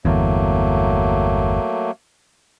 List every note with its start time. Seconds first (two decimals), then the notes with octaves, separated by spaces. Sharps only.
0.05 G1 E2 F#3 A3 A#3